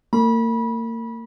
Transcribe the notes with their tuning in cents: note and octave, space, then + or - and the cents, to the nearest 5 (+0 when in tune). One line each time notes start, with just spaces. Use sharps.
A#3 -35 B5 -25